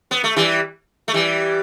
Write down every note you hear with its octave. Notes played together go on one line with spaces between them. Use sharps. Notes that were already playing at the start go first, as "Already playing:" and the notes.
B3
A3
E3 G3
A3
E3 G3